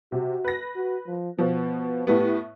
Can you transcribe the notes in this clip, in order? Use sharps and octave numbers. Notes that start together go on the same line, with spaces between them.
C3 F#4
B4 A#6
F#4
F3
B2 F3 B3
A2 A3 B3 G4